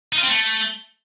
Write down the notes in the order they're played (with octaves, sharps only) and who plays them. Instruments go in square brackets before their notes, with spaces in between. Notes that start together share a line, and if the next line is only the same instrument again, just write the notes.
[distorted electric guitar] D#4
F4
C4
A3